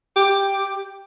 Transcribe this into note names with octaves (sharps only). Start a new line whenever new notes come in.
G4